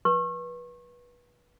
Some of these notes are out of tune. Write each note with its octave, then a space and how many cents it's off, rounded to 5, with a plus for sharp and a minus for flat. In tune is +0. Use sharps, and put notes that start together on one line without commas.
B4 -25 C#6 -35